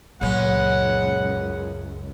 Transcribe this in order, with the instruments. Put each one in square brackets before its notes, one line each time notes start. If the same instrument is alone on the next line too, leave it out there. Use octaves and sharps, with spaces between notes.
[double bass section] C#2 F#2 [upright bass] A#2 F#3 [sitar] G#3 B3 C#4 [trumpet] F#5